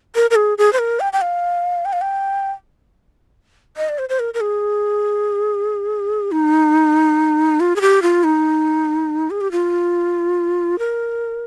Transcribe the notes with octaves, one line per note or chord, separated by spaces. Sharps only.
A#4
A#4
G#4
G#4
C5
A#4
G5
G5
F5
G5
F5
G5
D#5
D5
C5
C5
A#4
A#4
G#4
D#4
F4
G#4
G4
F4
D#4
G#4
G4
F4
A#4